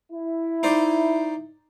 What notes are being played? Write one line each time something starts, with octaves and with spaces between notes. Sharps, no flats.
E4
D#4 C5 D5